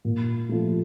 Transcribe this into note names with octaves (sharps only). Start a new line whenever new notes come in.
A#2
F3 A3